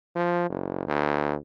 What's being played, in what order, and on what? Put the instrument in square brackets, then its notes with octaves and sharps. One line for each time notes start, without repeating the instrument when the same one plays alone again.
[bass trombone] F3
F#1
D2